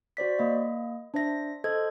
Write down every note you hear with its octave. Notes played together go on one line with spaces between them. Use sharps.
F#4 C5 D5 B6
A#3 D#5
D4 C5 E5 A#6
A4 C5 D#5 G#6